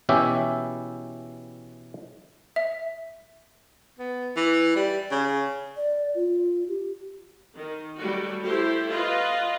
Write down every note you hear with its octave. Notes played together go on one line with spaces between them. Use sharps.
B2 E3 C#4 E4 G4 E5
E5
B3
E3
G3
C#3
D5
F4
G4
D#3
F#3 G3 A3 F#4
A3 E4 G4 A4 C5
F4 B4 D#5